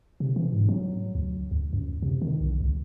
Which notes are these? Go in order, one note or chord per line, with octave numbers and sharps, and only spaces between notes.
C3
E3
G#2
F#3
D2
D2
F#2
C3
D#3
B1
C#2